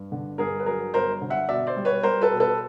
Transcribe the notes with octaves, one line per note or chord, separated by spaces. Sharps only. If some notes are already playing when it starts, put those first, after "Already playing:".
Already playing: G2
D3
G2 G#4 A#4
B4
F#3 G#4 A#4
G1 A#4 C5
D3
E5 F#5
B2 D5 E5
C5 D5
G3
B4 C#5
G3 A#4 C5
A4 B4
B2
A4 B4